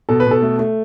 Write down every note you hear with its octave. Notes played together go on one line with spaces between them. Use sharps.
B2 A4
B4
B2 A4
A3
A3